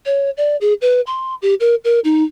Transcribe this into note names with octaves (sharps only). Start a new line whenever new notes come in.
C#5
D5
G#4
B4
C6
G4
A#4
A#4
D#4